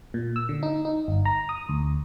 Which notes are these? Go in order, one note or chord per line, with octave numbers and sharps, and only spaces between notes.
A#2
E6
D3
D#4
D#4
G1
A#5
D#6
D2